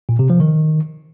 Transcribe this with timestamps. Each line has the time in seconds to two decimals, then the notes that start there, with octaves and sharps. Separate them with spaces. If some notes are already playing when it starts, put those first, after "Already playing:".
0.09 A#2
0.19 C3
0.30 F3
0.40 D#3